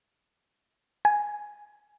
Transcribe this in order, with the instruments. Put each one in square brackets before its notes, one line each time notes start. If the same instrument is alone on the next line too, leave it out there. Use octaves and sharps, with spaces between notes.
[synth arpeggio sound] G#5